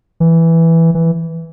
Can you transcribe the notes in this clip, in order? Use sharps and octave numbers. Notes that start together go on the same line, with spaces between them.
E3
E3